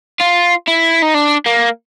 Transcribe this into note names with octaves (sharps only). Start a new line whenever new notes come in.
F4
E4
D#4
D4
A#3